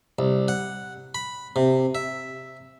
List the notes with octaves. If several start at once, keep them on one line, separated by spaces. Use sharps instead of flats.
C2
F#5
B5
C3
E5